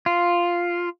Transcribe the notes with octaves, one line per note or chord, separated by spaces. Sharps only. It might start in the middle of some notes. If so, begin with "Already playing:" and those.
F4